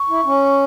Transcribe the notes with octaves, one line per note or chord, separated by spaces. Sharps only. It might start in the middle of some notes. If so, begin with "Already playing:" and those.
Already playing: C#6
E4
C#4